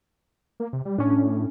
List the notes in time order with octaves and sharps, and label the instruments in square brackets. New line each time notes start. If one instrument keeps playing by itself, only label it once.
[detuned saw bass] A#3
C3
G3
[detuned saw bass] A2 [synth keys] C#4 D4